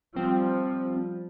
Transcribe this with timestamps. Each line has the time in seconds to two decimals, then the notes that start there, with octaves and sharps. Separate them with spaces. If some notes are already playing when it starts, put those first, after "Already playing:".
0.16 F3 G3 C4